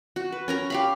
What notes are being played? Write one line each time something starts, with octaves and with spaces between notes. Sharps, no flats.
F#4
B4
C#4 A#4 A#5
G4 F5 B5